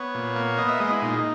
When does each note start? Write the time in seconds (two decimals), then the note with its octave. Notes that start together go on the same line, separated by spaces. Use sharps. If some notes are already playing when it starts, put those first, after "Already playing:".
Already playing: B3 C#5
0.14 A#2
0.36 A#3
0.57 B3 D#5
0.68 E5
0.80 G#3 D#5
0.91 E4
1.02 A#2 D#4